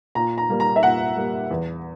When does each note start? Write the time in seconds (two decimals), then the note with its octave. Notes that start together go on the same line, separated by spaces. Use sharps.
0.15 A#2 A#5
0.38 A#5
0.49 G3 A#3
0.60 A#5
0.76 E5
0.83 A#2 F#5
1.16 G3 A#3
1.51 E2